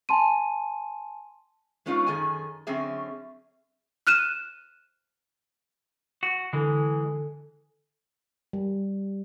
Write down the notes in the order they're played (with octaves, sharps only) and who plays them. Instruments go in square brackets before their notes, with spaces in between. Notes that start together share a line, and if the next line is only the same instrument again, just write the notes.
[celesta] G#5 A5 C6 D#7
[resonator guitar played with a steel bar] G#3 B3 C#4 D#4 F4
F#2 D#3 G#4 A4 G#5
D3 F#3 C4 C#4 G#4 E5
[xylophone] F6 F#6 D#7 E7
[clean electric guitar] F#4
[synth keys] D3 A4 G#5 [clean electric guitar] E3 G#3
[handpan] G3